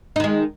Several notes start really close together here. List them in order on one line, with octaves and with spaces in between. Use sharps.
D#4 D#3 G#3